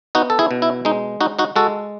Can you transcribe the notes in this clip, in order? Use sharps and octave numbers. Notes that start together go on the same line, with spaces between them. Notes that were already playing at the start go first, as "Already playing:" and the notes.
B3 D#4 F#4
A4
E4 G#4
B2
E4
G#3 D#4
D#4 F#4
D#4 F#4
G#3 F#4 A4